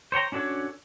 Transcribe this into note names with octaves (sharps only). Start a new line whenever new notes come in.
C5 C#5 G5 A#5
C#4 D4 F#4 A4 C#5